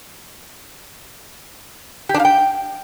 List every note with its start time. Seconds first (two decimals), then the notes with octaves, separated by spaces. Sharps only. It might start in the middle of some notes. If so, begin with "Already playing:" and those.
2.09 G4
2.14 D4
2.20 F5
2.25 G5